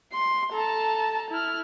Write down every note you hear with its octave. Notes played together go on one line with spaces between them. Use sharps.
C6
A4 A5 A#5
E4 F6